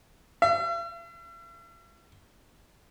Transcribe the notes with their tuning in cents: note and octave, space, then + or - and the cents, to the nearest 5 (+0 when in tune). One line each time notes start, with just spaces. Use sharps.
E5 +45